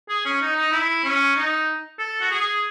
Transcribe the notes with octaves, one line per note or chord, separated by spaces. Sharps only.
G#4
C#4
D#4
D#4
E4
C#4
D#4
A4
F#4
G#4